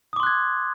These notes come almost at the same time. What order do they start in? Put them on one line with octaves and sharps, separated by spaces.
D#6 D6 C6 F#6 G#6